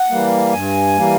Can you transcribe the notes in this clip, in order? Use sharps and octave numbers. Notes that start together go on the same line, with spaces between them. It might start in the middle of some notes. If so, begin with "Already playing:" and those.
Already playing: F#5
E3 G3 A#3
G2 G#5
E3 G3 A#3